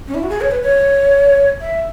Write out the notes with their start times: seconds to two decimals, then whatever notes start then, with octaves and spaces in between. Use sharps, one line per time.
0.08 C#4
0.15 E4
0.23 F#4
0.30 G#4
0.41 C#5
0.51 B4
0.62 C#5
1.60 E5